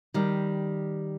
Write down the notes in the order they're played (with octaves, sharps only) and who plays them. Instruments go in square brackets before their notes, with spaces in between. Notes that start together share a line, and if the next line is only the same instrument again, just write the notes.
[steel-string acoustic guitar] D#3 G3